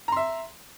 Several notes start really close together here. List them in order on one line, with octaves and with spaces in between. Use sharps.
A#5 C6 E5